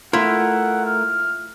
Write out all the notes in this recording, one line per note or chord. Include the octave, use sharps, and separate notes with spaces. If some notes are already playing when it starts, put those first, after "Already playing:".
A3 E4 F4 A#4 F#5
F6